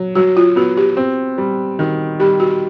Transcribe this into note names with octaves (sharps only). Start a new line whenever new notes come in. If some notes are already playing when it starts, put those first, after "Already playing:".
Already playing: F#3
F#3 F#4
F4
B3 F#4
G4
C4
G3
D#3 F#4
G3 G4
F#4